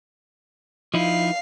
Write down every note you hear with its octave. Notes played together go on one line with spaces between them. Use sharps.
F3 D#4 E4 F5